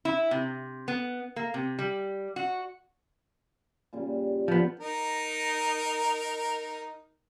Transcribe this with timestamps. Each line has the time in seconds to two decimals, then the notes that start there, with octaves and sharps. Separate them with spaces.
0.05 E4
0.31 C3
0.88 B3
1.36 A#3
1.54 C3
1.79 G3
2.36 F#4
3.93 A#2 C#3 G3
4.48 A#2 D3 F3 B3
4.80 D#4 A#4